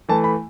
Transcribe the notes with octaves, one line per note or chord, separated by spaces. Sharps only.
E3 A3 A5
B5